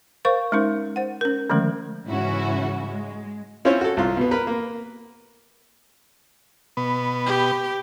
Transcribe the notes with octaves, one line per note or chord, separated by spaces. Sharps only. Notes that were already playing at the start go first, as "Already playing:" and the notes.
A#4 C5 F5 C#6
G#3 C#4 D#4 A#4
C5 F#5
C#4 A#4
D3 D#3 F3 G#3 A3 C#4
G#2 C#3 E3 C#4 E4 F#4
G#3
C4 C#4 E4 F4 C5 C#5
F#4 A4
C2 F4
B2 B3
A#4 B4 B5
A#3
B2 B3
G4